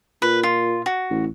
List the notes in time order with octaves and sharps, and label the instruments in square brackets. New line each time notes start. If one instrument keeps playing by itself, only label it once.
[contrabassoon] A#2 [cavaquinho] B4
[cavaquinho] F4
F#4
[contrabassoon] A1